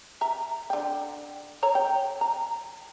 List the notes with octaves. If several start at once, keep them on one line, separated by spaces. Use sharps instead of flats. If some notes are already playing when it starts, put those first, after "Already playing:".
E5 A#5
D3 G5
A4 C#5 A#5
G5
A#5